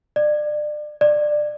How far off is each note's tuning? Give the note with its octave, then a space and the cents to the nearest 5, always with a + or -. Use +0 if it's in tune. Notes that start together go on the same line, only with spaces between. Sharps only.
D5 +30
D5 +20